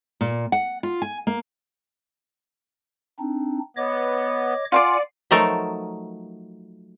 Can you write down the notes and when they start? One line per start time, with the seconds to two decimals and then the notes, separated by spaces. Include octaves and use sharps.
0.21 A#2
0.52 F#5
0.83 F4
1.02 G#5
1.27 A#3
3.19 C4 D4 D#4
3.77 B3 C#5 D#5 D6
4.72 F4 D5 F#5 G#5 C6 D6
5.31 F3 F#3 A3 D#4 A4 A#4